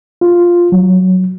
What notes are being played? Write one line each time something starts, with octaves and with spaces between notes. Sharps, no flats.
F4
F#3